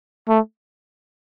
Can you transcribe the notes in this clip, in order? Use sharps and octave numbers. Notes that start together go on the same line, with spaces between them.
A3